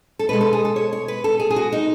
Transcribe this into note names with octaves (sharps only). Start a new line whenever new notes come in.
A4
B2 G#3 B4
A4
G#4
A4
C#5
C#5
B4
A4
G#4
G#4
F#4
D#4